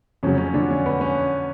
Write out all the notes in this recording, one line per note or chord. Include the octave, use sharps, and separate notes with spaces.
F2 C#3 F#3 C#4
C#4
D3 D4
C#4
B3
C#4